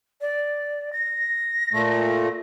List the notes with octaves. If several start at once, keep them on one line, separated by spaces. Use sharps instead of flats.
D5
A#6
A#2 A3